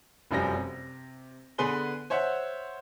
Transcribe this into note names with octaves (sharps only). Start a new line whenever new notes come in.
F1 F#2 F3 G3 A#6
C3
D3 B3 G#4 B4 C6 G7
C5 C#5 E5 F#5